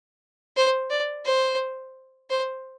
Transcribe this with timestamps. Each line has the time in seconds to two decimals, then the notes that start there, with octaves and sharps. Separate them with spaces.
0.57 C5
0.90 D5
1.25 C5
2.30 C5